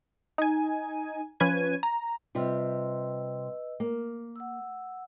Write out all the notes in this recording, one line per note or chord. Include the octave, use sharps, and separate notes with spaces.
D#4 G#5
F3 C#4 B4 G#6 D#7
A#5
C3 G3 F4 B4 D#5 E6
A#3
F#5 E6